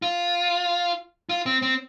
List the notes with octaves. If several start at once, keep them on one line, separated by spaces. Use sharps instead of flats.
F4
F4
C4
C4